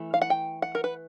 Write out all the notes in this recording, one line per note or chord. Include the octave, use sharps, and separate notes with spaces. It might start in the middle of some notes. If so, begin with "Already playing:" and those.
Already playing: E3 A3
F5
F#5
G5
F#5
A#4
B4